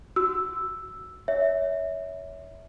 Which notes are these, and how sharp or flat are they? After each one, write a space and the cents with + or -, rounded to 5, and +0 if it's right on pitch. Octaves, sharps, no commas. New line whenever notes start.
F#4 +0 E6 +0
C#5 +25 E5 -15